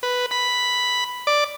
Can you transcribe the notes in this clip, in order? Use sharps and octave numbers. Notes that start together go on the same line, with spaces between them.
B4
B5
D5